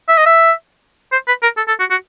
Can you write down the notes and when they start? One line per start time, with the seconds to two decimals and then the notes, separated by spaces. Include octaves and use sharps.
0.08 E5
0.18 D#5
0.26 E5
1.12 C5
1.28 B4
1.43 A#4
1.57 A4
1.68 A4
1.80 F#4
1.91 F#4